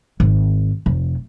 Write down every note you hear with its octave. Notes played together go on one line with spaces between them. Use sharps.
G#1
F1